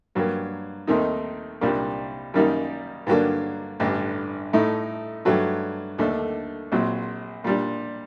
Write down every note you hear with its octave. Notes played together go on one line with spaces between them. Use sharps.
G2 F#3 A#3
D#2 D#3 A3 C4 D#4
C2 A#2 G3 A#3 D4
F#2 D#3 G3 A#3 D#4
G2 D3 F#3 A#3 D4
A1 G2 D3
A2 A3 D#4
G2 F#3 A3
D#2 D3 A3 D4
A#1 A#2 F#3 C4
A#2 G3 D4